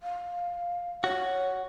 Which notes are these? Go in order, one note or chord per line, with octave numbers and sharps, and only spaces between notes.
F5
F#4 C#5